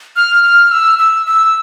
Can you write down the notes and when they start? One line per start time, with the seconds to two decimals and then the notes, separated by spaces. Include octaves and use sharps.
0.16 F6
0.44 F6
0.71 E6
0.99 E6
1.26 E6